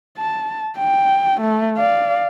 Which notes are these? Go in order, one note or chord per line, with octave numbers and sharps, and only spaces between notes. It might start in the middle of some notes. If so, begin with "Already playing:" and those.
A5
G5
A3
D5 F5